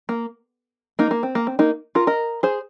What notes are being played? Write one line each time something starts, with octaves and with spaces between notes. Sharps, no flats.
A#3
A#3 D#4
A#3
C4
A#3
C4
A#3 D#4
F4 A#4
A#4 D#5
G#4 C5